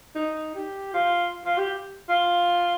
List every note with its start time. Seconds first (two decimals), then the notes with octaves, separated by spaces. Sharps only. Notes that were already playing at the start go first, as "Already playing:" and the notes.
0.15 D#4
0.55 G4
0.94 F4
1.45 F4
1.58 G4
2.09 F4